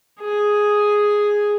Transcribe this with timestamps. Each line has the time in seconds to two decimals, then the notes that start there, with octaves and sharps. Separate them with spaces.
0.20 G#4